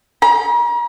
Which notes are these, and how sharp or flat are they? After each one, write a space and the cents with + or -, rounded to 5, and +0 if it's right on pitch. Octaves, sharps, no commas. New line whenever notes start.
A#5 +40